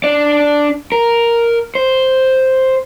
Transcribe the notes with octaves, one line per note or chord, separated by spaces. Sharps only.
D4 D5
A#4
C5